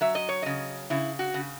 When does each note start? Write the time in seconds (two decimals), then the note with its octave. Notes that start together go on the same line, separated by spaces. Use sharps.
0.01 F#3 E5
0.15 D#5
0.29 C#5
0.42 C#3 D#5
0.90 C#3 E4
1.19 F#4
1.34 C#3